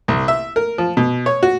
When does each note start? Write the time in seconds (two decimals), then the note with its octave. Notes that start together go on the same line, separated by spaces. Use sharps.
0.08 C2
0.28 E5
0.56 A#4
0.78 F3
0.97 B2
1.26 C#5
1.43 F#4